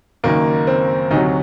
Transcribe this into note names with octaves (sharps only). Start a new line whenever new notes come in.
F#1 F#2 D#3 A#3
C4
D2 C3 F#3 D#4